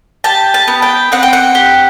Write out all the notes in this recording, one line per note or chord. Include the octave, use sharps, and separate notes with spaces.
G4 A5
A5
B3
G5
C4 F#5
G5
F#5
G4